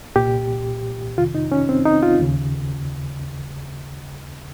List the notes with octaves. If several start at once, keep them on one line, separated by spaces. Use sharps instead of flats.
C2 A#2 G4
F2 C3 D#3 F4
D#4
C#4
C4
D#4
F4
D#2 C#3